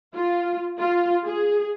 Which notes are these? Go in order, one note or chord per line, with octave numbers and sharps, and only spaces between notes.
F4
F4
G#4